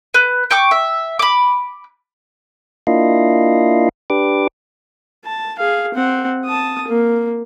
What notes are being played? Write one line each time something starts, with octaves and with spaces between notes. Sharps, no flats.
B4
G5 C#6 D6
E5
B5 D6
A#3 D4 E4 F4 D#5 F5
D4 G4 B4 D6
A5
G#4 F5
C4 F#5
A5 D#6
A#3